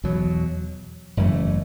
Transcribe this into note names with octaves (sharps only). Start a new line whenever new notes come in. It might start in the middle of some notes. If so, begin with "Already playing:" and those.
E2 B2 F#3
F#1 F#2 E3 A3